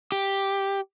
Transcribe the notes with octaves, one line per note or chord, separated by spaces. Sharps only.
G4